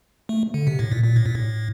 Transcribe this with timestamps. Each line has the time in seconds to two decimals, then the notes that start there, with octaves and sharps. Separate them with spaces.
0.29 A3
0.54 D3
0.67 C3
0.79 A2
0.92 A#2
1.04 A#2
1.16 A2
1.26 A#2
1.35 A2